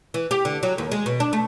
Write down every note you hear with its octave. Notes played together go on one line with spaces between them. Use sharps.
E3
G4
D3
F#3
D#2
G#3
B2
D4
A3